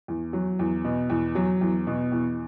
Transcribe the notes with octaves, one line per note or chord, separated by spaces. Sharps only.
E2
F#3
E2
B2
E2
F#3
E2
B2
E2